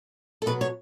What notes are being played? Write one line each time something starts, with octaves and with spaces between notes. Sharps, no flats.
A4
B2 F#3 B3 B4
C#5